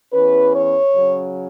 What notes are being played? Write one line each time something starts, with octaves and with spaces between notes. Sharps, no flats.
E2 E3 C#4 B4
C#5
C#3 F#3 C#4